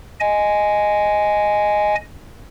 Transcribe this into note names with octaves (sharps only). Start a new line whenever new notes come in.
D#5 G#5